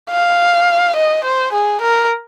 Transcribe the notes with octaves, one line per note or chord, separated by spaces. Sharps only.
F5
D#5
C5
G#4
A#4